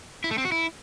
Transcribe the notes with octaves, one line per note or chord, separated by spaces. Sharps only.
E4
A3
C4
F#4
E4